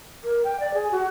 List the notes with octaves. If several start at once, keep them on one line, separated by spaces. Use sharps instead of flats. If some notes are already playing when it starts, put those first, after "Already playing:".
A#4
G5
D5
G#4
F#4